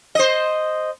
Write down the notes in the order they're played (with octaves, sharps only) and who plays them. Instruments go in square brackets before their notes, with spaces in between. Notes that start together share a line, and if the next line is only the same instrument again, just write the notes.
[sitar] C5 D#5